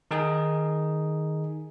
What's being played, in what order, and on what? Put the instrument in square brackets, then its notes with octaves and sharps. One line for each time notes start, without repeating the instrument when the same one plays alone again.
[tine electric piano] D#3 D#4 G#4